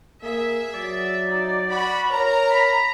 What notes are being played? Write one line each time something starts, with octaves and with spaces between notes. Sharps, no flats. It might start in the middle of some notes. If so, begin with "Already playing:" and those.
A#3 G#4 E5
F#3 D5
D#4
F#4 B5
A#4 C#5 A#5
B5